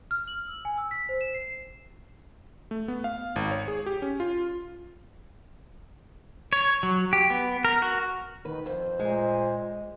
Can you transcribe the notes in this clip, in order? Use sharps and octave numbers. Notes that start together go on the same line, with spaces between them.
F6
F#7
E6
G#5
E6
B6
C5
E7
C7
A3
B3
F5
G#1
C#5
G#4
G4
C#4
F4
C#5
F#3
G4
B3
A#4
F#4
D#3 B4
F2 C5
A#2 G#3